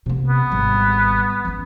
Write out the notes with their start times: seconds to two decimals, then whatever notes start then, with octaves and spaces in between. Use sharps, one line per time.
0.06 C3 A#3
0.28 B3
0.51 G#1 G3
1.45 E3 C#4